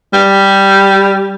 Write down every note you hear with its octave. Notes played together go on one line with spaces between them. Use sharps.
G3